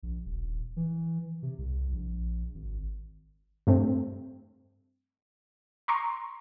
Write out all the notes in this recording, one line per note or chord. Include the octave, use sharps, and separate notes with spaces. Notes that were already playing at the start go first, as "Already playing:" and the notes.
A#1
D#1
E3
C3
C2
A#1
G#1
G2 A3 C4
A#5 C6 C#6